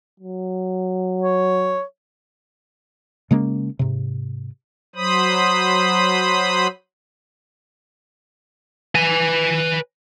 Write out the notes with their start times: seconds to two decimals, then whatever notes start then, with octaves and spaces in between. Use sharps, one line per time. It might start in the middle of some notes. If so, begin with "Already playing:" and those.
0.20 F#3
1.22 C#5
3.31 C#3 G#3 A#3 C#4
3.79 G#2 C3
4.96 F#3 C5 B5 D#6
8.95 B4 G#5